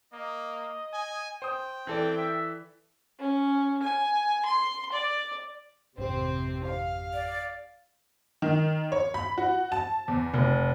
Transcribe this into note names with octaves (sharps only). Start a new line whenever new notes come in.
A#3 D#5
G#5
C5 G5 D#6
E3 C4 A4 D5
E5
C#4
G#5
C6
D5
G#1 F2 C3 C4 G4
F5
D5
D#3
C#5
B5
F#4
A5
E2
F1